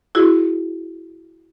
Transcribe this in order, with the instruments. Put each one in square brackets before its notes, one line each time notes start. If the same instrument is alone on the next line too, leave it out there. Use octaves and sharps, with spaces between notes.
[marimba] E4 F#4 G#4